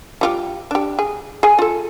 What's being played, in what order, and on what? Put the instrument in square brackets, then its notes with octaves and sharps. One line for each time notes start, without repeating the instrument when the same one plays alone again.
[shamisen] G3 F4 G4
D4 G4
G#4
G#4 G#5
F4 A4